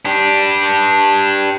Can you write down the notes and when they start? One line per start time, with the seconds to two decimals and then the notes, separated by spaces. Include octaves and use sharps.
0.05 D4 G4